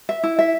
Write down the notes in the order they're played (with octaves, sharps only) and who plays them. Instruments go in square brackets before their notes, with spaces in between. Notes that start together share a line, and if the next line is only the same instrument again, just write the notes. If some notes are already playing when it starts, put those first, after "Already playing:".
[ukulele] E5
E4
E5